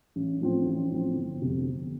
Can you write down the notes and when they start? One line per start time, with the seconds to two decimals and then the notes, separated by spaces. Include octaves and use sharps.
0.16 A1
0.41 A2 F3 C4
0.66 A1
0.91 A2 F3 C4
1.17 G1
1.42 F2 C3
1.66 G1